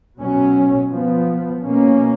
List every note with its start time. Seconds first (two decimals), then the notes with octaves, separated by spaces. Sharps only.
0.20 B2 F#3 C#4
0.92 F3 B3
1.65 B2 A#3 C#4